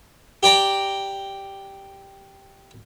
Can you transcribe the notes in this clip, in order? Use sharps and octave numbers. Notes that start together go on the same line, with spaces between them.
G4 D5 G5 A#5